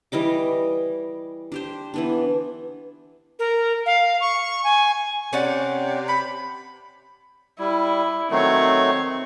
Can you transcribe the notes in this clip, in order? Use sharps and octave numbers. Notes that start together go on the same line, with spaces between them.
E3 G3 D#5 D6
D4 G4 C5
E3 B3 D4
A#4
F5
C#6
G#5
C3 C#4 D5 F#5
B5
G3 E4
D#3 F#3 A3 C4 C#5